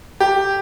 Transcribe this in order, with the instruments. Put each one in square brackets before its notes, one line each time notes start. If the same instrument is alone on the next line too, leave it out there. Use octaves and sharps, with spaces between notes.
[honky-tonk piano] G4